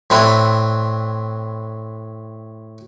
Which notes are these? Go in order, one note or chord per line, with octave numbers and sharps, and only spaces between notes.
A2 C4 D4 E4